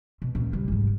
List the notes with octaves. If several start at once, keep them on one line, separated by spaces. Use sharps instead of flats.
B2
C#2 A#2
G3
G#2 G3